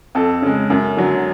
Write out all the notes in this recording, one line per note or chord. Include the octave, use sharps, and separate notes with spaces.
F2 A4
C#3 G#3
F#2
D3 F#3